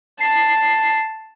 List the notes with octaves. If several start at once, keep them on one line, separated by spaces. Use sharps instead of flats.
A5 C7